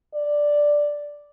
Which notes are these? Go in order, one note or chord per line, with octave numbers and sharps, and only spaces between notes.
D5